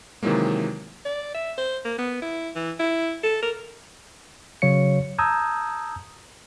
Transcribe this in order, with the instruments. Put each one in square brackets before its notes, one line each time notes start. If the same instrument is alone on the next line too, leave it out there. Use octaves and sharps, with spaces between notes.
[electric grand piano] C3 D#3 E3 F#3 G#3 A#3
[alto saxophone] D5
E5
C5
A#3
B3
E4
E3
E4
A4
A#4
[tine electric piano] C#3 F#3 C#5 F5 C#7
A5 A#5 D#6 E6 G6 G#6